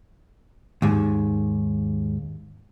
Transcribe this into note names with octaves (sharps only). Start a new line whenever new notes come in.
D#2 G#2